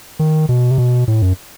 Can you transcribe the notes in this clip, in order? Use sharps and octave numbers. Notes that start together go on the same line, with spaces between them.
D#3
B2
C3
B2
A2
F#2